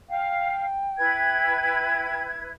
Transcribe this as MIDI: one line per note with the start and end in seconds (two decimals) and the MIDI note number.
0.10 0.64 77
0.10 2.24 79
0.98 2.50 64
0.98 2.50 71
0.98 2.50 92